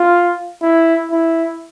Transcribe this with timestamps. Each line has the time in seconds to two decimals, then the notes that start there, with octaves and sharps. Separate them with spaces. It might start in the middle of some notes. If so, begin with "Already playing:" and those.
Already playing: F4
0.62 E4
1.12 E4